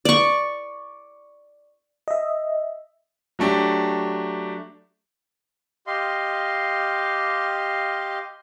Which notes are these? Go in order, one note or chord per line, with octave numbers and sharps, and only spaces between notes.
D5 C#6
D#5 E5
F#3 A3 D4 G4
G4 D#5 F5 C6